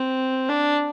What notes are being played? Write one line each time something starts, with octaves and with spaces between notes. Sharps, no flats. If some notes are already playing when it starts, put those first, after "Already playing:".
Already playing: C4
D4